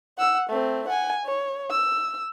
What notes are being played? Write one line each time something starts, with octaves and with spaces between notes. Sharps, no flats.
F#5 E6
A3 C4
F#5 G#5
C#5
E6